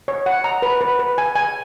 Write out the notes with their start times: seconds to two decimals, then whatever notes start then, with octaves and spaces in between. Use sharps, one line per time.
0.08 C#5
0.26 F#5
0.44 A#5
0.62 B4
0.81 B4
0.99 B4
1.18 G#5
1.35 G#5